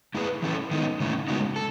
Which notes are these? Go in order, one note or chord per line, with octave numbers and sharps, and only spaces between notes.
A3 E4 G#4 B4
E3 A3 C#4 E4 A4
D#3 G#3 B3 D#4
C#3 E3 A3 C#4
C#3 G#3 B3 D#4 F#4
A4